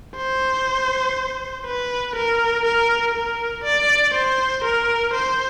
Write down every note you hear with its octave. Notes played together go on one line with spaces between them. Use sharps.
C5
B4
A#4
A#4
A#4
D5
C5
A#4
C5